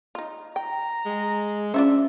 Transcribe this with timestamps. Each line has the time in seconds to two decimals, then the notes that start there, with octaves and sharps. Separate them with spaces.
0.15 D#4 F4
0.56 G5 A#5
1.06 G#3
1.74 C#4 D4 F4 C5 E5